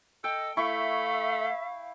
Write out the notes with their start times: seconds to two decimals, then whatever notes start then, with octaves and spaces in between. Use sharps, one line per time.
0.24 A4 D#5 G5
0.57 A3 E4 E5 F5 C#6